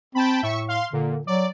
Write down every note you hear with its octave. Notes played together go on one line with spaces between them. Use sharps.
C4 G5 A5 B5
A2 E5 C#6
F5 C6
A#2 D3
F#3 D5